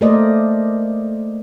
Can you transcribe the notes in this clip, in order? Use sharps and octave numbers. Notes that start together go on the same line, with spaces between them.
A3 A#3 A#4 C5 D5 D#5